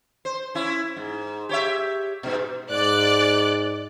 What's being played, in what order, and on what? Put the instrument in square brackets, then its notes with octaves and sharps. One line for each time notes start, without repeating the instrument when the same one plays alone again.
[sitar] C5
C#4 E4
G#2
G4 C#5 E5
G#2 B2
[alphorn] G#2 [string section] D5 F#6